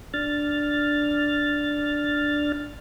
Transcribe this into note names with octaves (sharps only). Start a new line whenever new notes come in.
D4 F6 A6